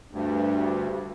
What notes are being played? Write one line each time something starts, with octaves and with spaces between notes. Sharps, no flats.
D2 G2